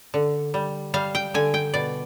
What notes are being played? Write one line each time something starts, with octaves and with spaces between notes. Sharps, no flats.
D3
G3
G3 F5
G5
D3 G#5
G5
B2 D5